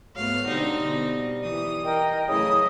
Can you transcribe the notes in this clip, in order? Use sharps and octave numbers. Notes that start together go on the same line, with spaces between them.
G#2 F#3 A3 B3 F5
B2 D3 G3 C4 D#4
B2
E3 D#6
A#4 D#5 G5
F#2 C#3 E3 A3 E4 D#5 D#6